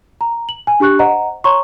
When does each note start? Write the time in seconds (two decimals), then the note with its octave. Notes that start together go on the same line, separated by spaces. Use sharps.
0.21 A#5
0.49 F#7
0.67 G#5
0.80 D4 G4 C#6 F#6
0.99 C5 D#5 F#5 A#5
1.44 C#5 A#5 C6 C#6